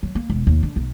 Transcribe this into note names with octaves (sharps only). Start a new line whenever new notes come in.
F#3
A#3
E1
D#2
D3
B1